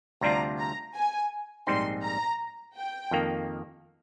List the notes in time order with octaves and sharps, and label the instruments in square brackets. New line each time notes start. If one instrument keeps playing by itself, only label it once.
[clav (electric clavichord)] D2 C3 G3 D4 F4 [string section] A#5
[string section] A#5
G#5
[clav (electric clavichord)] A#1 G#2 G3 C4 D#4 [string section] C6
[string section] A#5
G5
[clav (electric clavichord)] F2 D#3 A#3